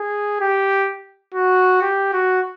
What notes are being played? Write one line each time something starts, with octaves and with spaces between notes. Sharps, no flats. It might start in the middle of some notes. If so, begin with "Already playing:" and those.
Already playing: G#4
G4
F#4
G4
F#4